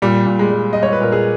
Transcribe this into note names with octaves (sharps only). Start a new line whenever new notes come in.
A#2 G3
A#2
G#3
G3
G3 D#5
C#5
B4
A#2 A#4
G#4